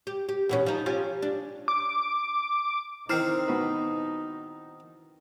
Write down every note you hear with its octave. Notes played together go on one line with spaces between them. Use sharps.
G4
G4
E2 B2 C#4
F3 D#4
C#4 F4 G4
D4
D6
D#3 C4 D#4 E4 C5 F6 C7
B2 F#4 B4